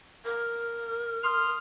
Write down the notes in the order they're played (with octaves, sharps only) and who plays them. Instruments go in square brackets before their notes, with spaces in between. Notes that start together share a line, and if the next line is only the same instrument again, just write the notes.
[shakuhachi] A#4
[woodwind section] C6 D#6 F6